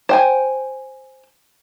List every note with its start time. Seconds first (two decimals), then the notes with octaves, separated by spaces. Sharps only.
0.09 C5 G5 G#5